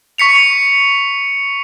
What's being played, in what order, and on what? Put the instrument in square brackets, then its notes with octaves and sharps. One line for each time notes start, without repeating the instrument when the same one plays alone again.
[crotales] C#6 B6 C#7 F7